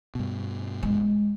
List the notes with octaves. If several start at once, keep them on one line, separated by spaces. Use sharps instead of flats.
G2 B2
G#3